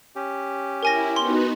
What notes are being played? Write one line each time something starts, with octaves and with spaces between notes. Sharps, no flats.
C#4 G4
E4 A#4 G#5 A#6
B3 D#4 F#4 C6 G7